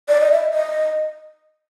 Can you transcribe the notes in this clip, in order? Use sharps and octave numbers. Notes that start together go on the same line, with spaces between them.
D5
D#5
E5
D#5